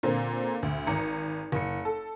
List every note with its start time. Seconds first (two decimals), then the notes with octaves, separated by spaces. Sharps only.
0.03 A#2 D3 A#3 C4
0.63 D2
0.87 G#1 A#5 C#7
1.52 F#1 C#7
1.85 A4